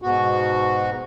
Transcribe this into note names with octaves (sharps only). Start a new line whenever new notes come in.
G#2 B2 F#4